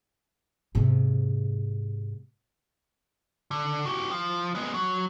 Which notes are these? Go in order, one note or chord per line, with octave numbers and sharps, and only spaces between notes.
G#2 C3
D3
F#4 G4
F3
G#3 B3
F#3